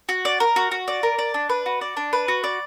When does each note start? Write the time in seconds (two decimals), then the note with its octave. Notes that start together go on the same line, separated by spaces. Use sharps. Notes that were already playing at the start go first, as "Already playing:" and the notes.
0.09 F#4
0.25 D5
0.40 A#4
0.56 F#4
0.71 F#4
0.88 D5
1.03 A#4
1.19 D5
1.34 D4
1.49 B4
1.66 F#4
1.81 D5
1.97 D4
2.13 B4
2.28 F#4
2.44 D5